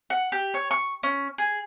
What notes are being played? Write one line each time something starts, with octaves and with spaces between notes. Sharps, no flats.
F#5
G4
C#5
C#6
C#4
G#4